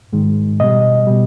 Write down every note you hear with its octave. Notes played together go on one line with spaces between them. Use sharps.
G#2 D#3 G#3
B2 G3 D#5
B2 G3